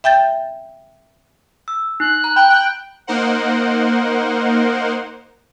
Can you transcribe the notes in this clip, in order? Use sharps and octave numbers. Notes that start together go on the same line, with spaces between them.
E5 G5 G6 A6
E6
D#4 F#6
A#5
G5 B5
G5
A#3 D#4 A#4 C5 F#5